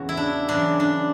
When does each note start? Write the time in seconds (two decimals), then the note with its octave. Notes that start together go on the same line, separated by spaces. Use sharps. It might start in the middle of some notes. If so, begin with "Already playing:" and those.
Already playing: E2 C#3 E3 F#4
0.09 E4
0.17 D4
0.48 F#2 C#3 E3 D4
0.80 D4